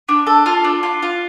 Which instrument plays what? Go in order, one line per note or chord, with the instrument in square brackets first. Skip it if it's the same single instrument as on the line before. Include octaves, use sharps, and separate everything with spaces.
[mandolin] D4
A4
F4
D4
F4
F4